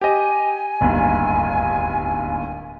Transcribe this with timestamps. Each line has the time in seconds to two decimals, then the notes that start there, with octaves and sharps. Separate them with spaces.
0.01 G4 D#5 G#5
0.81 D1 G1 D#2